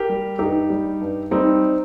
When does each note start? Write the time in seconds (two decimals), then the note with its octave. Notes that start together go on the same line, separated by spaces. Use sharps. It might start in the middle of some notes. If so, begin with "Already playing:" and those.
Already playing: G4 A#4
0.09 G3
0.39 G2 D#4 G4
0.70 G3
1.01 G2
1.31 G3 C4 D#4